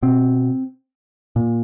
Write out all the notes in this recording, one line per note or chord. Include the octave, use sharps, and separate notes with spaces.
B2 C4
A#2